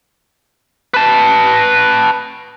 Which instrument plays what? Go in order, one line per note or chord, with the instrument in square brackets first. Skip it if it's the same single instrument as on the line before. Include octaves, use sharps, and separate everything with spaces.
[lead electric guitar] B4 A5